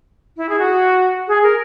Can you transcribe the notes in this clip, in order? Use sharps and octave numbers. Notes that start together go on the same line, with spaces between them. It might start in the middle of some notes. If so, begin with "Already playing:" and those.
E4
G#4
F#4
G#4
A#4